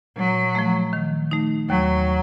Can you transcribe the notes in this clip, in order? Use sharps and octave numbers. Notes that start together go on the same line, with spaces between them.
A#2 F#3
F3 A3
D#3
A3 D#4
D#2 F#3